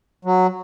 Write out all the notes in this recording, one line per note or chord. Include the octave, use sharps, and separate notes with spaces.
F#3